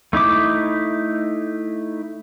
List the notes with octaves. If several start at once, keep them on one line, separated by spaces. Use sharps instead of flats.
A3 D#4 E4 D6